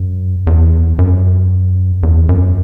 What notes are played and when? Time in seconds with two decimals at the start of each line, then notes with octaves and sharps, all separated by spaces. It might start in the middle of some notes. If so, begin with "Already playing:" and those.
Already playing: F#2
0.47 E2
0.99 F#2
2.03 E2
2.29 F#2